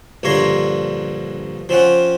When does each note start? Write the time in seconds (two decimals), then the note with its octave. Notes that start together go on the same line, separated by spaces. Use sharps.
0.23 A#1 G2 D3 C#5 A#5 C6
1.69 F3 C4 C#4 F#5